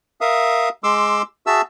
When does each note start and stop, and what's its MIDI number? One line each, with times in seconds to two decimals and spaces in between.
0.21 0.69 70
0.21 0.69 76
0.21 0.69 77
0.21 0.69 87
0.84 1.22 56
0.84 1.22 84
0.84 1.22 86
0.84 1.22 88
1.47 1.62 66
1.47 1.62 68
1.47 1.62 76
1.47 1.62 81
1.47 1.62 88